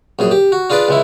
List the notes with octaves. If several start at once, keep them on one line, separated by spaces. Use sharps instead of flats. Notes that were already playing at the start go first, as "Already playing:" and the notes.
A#1 F#2 G#4
G4
F#4
D4 F4 G#4 B4 D5
C#2 G#3 E4